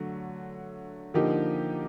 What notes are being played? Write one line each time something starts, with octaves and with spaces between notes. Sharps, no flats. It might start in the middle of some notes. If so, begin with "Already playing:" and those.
Already playing: D3 F#3 A3
D3 F3 A#3 D#4 G4